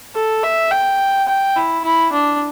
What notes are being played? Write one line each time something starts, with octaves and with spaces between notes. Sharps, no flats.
A4
E5
G5
G5
E4
E4
D4